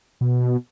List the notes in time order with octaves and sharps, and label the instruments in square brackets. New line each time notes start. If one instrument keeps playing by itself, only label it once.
[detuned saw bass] B2